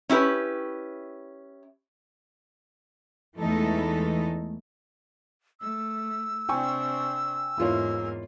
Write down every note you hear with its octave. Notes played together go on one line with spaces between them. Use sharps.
C#4 E4 G4 B4
E2 E3 G#3 A3 D#4 A4
A3 E6
C3 C4 D4 G5 G#5 C#6
E2 G#2 A#3 E4 F4 C#5